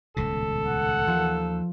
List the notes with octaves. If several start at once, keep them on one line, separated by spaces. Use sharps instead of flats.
D#1 C#2 B2 A4
F#5
D#2 F3